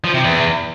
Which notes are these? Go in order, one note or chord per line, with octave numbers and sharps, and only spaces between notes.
F3
C3
E2